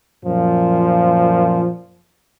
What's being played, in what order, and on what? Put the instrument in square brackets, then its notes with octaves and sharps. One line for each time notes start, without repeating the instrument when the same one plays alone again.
[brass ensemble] F#2 A#2 F3